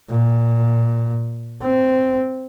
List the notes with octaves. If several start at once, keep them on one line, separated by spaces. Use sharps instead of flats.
A#2
C4